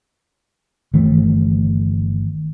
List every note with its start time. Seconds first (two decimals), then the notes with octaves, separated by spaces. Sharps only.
0.93 G1 D#3 E3 A3